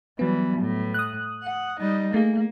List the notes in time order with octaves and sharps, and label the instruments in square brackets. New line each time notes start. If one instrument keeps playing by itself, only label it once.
[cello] E3 G3 [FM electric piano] F#3 B3
[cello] A2
[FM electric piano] D#6 F#6
[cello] F#5
G3 D#4
[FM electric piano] A3 G#4 [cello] A#3